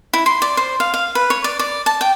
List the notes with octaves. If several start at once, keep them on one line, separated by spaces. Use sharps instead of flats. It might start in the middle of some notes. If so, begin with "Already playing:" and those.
E4
C6
D5
C5
F5
F5
B4
C#5
D5
D5
A5
G5